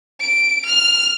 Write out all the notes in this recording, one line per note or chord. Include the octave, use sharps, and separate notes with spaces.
D7
F6